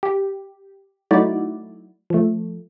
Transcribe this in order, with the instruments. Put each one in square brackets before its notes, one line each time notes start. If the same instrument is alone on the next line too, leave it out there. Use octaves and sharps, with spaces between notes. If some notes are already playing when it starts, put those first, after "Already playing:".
[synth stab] G4
F#3 A3 D#4 E4 F#4 D5
F3 A3